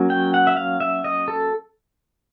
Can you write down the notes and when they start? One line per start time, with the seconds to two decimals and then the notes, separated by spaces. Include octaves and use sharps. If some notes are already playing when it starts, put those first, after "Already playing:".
Already playing: F#3 A#3 C#4
0.10 G5
0.34 F#5
0.47 E5
0.57 F5
0.80 E5
1.04 D#5
1.28 A4